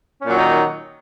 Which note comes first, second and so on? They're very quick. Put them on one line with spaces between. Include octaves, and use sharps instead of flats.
C#4 A#2 F#3 D#3 D#4